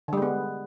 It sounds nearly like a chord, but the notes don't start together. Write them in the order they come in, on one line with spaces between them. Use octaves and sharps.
D3 G3 G#3 B3